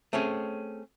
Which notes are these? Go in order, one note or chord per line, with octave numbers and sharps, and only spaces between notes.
A3 C4 C#4 G#4 C#5